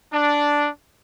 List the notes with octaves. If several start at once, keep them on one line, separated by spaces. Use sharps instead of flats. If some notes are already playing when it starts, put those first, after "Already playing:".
D4